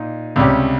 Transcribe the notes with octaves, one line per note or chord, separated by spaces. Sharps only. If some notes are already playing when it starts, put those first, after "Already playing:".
Already playing: A#2 D#4
C#2 C3 G3 C#4 G4